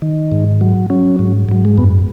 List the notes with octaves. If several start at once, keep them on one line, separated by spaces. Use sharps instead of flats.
D#3
G#2
F#3
F#3 C#4
G#2
G#2 F#3
G#3
F#2 B3